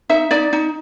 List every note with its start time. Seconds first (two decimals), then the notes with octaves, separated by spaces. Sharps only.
0.09 D#4 E5
0.31 D#4 D5
0.53 D#4